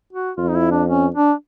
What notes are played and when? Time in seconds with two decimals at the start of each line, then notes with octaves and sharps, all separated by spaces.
0.13 F#4
0.37 F2 F4
0.48 D#4
0.54 E4
0.71 D4
0.88 C#4
1.14 D4